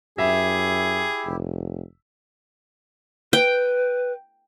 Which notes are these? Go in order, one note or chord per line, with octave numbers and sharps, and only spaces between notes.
F#2 E4 G4 G#4 E5
F1
B4 G5